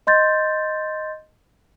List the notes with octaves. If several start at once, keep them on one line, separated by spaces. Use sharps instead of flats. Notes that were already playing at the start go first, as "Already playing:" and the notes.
D#5 C6 G6 A6